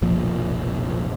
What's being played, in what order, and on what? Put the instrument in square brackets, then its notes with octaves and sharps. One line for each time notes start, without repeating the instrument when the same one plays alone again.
[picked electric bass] F1 B1 A#2 F3